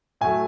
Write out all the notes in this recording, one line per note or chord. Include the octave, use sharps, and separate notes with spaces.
A2 F#3 A3 G#5